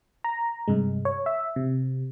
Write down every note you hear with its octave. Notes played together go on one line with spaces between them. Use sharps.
A#5
G2 C3 G#3
C#5
E5
C3